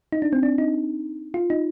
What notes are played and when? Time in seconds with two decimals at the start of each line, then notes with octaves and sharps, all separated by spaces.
0.12 D#4
0.22 D4
0.33 C4
0.43 D4
0.58 D#4
1.34 F4
1.50 D#4